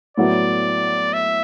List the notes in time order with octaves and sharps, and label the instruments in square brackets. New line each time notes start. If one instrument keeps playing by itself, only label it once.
[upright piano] A2 F#3 B3 F#4 [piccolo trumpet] D5
[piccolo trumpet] E5